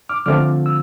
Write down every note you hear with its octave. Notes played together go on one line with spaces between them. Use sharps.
D6 F6
D3 F3 A3 C4 F4 D6 F6
E6